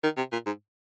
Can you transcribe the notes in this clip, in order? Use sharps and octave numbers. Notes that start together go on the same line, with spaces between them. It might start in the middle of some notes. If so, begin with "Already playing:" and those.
D#3
C3
A#2
G#2